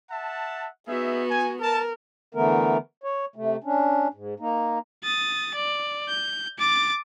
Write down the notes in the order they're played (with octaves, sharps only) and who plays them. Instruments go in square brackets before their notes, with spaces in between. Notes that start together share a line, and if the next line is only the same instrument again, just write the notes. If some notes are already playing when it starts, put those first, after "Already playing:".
[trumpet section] E5 F#5 A5
[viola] B3 F#4 [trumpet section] D#4 G#4 E5
[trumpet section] G#5
[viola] A#4 [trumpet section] A5
[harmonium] D3 E3 A3 B3 A#4
C#5
C3 A3
C#4 D4
G#2
A#3 D#4
[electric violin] D#6 A6
D5
G6
D6 A6